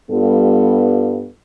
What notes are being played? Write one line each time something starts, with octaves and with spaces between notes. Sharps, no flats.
G2 G3 B3 F4 A4